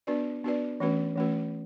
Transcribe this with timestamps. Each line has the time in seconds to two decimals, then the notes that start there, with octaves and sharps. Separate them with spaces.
0.07 B3 D4 F#4 B4 D5
0.44 B3 D4 F#4 B4 D5
0.80 E3 A3 C#4 F#4 B4
1.16 E3 A3 C#4 F#4 B4